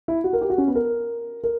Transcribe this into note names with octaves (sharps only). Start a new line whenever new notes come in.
E4
F#4
A#4
G4
F#4
C#4
B3
A#4
A#4